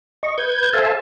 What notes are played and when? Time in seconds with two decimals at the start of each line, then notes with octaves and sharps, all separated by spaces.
0.23 D#5 C#6
0.38 B4 G6 G#6
0.73 A4 C5 E5 F5 G#5 A5